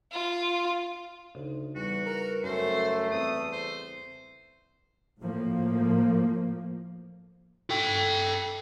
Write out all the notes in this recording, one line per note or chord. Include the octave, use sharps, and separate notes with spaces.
F4
D2 C#3 D#4
E2 G3 F#4
A#4 B4 A#5
F#2 A3 C5
E2 C4 D#6
C5
A2 F3 A#3
A4 G5